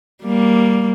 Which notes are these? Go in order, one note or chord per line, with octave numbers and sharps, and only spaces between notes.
G3 A#3